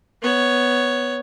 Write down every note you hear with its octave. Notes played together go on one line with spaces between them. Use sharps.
B3 C#5